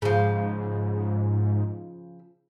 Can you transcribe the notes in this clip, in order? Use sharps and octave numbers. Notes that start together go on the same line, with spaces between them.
G#2 C#3 F3